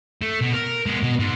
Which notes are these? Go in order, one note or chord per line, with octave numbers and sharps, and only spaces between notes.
A3
B2
A#4
G#3 B3
B2
G#2